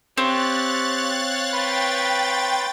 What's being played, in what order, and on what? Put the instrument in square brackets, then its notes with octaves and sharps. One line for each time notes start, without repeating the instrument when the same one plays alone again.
[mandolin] C4 [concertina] G4 [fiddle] C#5 F5 [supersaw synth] F#6 A6
[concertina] B4 B5 C6 [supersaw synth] G5 A6